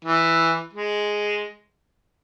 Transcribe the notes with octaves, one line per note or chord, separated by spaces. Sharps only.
E3
G#3